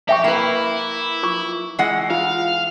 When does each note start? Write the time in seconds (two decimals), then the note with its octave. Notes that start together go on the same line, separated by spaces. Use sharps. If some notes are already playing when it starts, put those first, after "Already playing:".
0.09 G4 E5 G5 C#6
0.24 A#3 E4 B4
1.23 F4 C#6 D6
1.79 E3 G#3 F#5
2.11 F4 F5